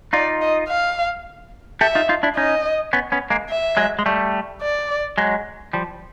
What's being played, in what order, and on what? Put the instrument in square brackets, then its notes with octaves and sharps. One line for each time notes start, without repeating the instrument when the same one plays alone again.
[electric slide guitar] D#4 F4 [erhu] D5
[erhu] D#5
F5
[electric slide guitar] G4 A4 [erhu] E5
[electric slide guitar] D#4 F4
D#4 F4
D4 E4
[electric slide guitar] C#4 D#4 [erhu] D#5
[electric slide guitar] B3 C#4
B3 C#4
G#3 A#3
[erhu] E5
[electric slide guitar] F#3 G#3
G#3
G3 A3
[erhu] D5
[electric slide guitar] F#3 G#3
F3 G3